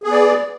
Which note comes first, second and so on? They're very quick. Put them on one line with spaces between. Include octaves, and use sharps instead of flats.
G#4 B3 D5